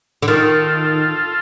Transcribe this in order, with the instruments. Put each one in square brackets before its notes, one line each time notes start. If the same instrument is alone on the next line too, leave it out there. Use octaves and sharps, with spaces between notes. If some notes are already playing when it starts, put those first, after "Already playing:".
[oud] D3
[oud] D#3 [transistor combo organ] F4 A4